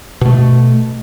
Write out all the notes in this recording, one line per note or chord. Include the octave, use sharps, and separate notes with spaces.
B2 A3